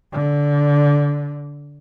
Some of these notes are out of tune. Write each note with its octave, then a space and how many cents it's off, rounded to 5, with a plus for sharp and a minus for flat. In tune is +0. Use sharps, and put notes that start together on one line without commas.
D3 -15